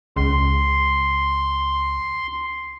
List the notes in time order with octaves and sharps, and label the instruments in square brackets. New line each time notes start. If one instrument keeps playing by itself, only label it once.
[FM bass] C#2 [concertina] C6